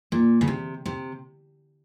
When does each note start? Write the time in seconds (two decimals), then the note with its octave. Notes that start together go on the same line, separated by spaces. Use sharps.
0.12 A#2
0.41 C#3
0.48 C3
0.86 C3